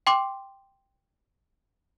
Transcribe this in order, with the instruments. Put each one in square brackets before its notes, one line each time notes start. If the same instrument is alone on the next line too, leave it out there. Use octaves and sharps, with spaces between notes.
[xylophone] G5 C6 D6